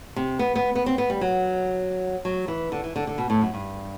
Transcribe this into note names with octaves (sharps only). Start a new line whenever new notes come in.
C3
B3
B3
B3
C4
B3
G3
F#3
F#3
E3
D3
E3
D3
D3
B2
A2
F#2
G2